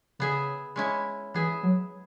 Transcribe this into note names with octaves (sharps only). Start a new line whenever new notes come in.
C#3 B3 G#4 E5
G#3 C#4 E4
E3 B3 G#4 E5
F#3